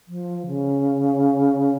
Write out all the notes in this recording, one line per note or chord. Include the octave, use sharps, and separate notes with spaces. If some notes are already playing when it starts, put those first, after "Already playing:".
F3
C#3